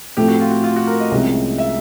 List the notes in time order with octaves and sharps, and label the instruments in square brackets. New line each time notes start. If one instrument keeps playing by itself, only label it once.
[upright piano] A2 F3 A3 C4 [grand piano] G4
[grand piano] F#4
F4
F#4
F4
F#4
A#4
D#5
[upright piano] C2 C3 F3 G#3 C#4
[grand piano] E5